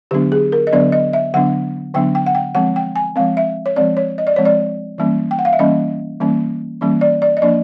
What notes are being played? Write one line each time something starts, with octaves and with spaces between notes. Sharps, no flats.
D3 F#3 B3 D4 G4
G#4
A#4
D#5
D3 F#3 B3 D4 D5
D#5
E5
D3 F#3 B3 D4 F#5
D3 F#3 B3 D4 G5
G5
F#5
G5
F3 G#3 C4 F#5
G5
G#5
F3 G#3 C4 F5
E5
C#5
F3 G#3 C4 D5
C#5
D#5
D5
F3 G#3 C4 C#5
D5
E3 G3 A#3 C#4
G5
F#5
F5
E5
E3 G3 A#3 C#4 D#5
E3 G3 A#3 C#4
E3 G3 A#3 C#4
D5
D5
D#5
F3 A#3 D4 D5